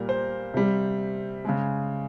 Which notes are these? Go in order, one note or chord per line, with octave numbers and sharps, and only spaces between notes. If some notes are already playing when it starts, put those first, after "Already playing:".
Already playing: A#2 G3 A#4
C5
C3 G3
C#3 G#3